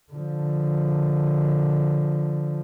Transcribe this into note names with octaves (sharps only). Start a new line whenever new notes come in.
D3 F3